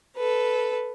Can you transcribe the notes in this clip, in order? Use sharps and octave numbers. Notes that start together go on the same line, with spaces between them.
A4 B4